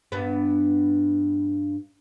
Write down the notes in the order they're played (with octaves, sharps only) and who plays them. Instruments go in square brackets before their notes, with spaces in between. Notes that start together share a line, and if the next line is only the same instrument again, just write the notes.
[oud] G2 B3